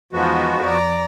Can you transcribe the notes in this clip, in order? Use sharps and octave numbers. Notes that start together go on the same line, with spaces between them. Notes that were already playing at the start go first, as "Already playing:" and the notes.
E2 F3 G#3 B3 D#4 F#4
F2 D5 A#5